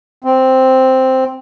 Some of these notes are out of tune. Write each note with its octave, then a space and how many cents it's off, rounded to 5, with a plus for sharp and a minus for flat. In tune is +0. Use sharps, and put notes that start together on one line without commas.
C4 +0